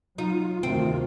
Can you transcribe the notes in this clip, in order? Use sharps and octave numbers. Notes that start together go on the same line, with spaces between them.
F#3 D#4 F4
D2 C3 D#3 C4